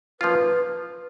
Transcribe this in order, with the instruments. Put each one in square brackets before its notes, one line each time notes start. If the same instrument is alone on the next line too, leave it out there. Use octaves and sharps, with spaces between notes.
[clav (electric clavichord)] F3 A#3 C#4 F4 [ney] B4